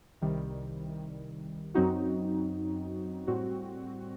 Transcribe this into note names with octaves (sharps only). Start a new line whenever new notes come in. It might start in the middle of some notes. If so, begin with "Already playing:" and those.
C2 C3 D#3 G3
F#2 F#3 C4 D#4 F#4
A2 G3 C4 F#4